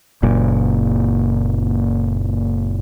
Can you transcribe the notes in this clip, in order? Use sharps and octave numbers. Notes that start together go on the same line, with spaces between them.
F#1 A#2